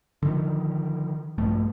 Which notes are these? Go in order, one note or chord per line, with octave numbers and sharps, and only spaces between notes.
D3 D#3 F3
A#1 G2 A3